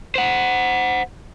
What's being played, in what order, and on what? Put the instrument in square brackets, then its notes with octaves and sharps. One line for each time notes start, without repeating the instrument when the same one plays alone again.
[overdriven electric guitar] C5 F#5